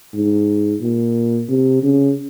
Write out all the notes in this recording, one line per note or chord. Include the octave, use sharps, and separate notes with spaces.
G#2
A#2
C3
C#3